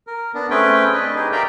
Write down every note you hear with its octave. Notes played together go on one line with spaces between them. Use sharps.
A#4
B3 D4
A3 C4 C#4 G#4 B4 G5
D4 B4 D#5
D#4 G4 G#4
A#4 D5 E5 F5 G5 A#5